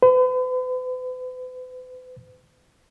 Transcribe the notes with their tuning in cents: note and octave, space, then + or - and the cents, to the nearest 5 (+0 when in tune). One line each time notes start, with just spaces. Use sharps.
B4 +45